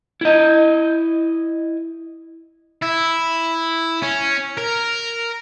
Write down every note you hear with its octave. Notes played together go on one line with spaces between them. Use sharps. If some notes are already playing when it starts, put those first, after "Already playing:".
E4 D#5
E4
C#4
A#4